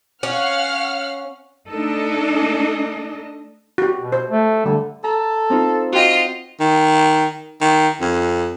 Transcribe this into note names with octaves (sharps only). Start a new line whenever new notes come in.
C#4 F5 F#5 F6
A3 D4 D#4 A4 D#5
F#4 G4
B2
C5
A3
D3 G3
A4 A#5
C4 D#4 F4
F4 F#4 D#5 G5
D#3
D#3
F2